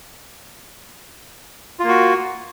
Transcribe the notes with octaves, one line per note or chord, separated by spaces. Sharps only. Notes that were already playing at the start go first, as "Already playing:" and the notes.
A#3 F4 F#4